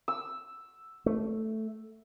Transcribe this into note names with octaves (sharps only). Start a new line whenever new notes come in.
E6
A3